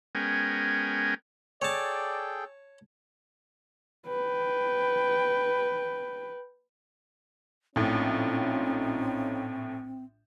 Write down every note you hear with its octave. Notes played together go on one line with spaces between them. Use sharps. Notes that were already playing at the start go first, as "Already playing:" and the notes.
G#3 B3 C#4 A#4 G5 G#5
G#4 A4 C#5 D5 G5 A5
B4 G5
A#1 A2 C4 C#4 D#4 F4